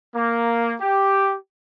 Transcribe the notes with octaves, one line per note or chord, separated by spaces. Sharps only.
A#3
G4